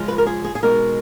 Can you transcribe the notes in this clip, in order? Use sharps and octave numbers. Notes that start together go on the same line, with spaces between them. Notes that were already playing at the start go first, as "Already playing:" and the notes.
Already playing: C#3 F3 G#3 C#4 F4
B4
A#4
G#4
G#4
G#4
B2 G#3 D#4 A#4